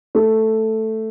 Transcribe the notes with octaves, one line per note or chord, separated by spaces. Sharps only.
A3